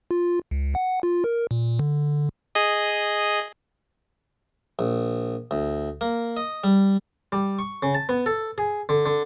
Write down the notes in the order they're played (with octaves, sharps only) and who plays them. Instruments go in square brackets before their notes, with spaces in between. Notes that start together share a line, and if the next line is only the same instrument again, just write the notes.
[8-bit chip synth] F4
C#2
F#5
F4
A#4
A#2
D3
G#4 D#5
[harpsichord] A#1
D2
A#3
D#5
G3
G3
C#6
C#3
A5
B3
A4
G#4
D3
D3